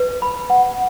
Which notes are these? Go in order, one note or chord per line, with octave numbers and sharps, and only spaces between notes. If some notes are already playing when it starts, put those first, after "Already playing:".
Already playing: B4
B5
F#5